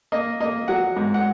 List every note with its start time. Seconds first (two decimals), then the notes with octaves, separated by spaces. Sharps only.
0.12 A#3 D#5
0.40 A#3 D#5
0.68 F#3 F#5
0.96 G#2
1.14 F#5